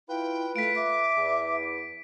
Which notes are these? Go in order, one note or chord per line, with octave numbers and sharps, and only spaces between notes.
E4 F4 B4 G5
A3 F5 B6 D7
E5 D6
E2